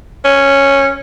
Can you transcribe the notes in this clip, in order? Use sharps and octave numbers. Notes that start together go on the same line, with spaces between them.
C#4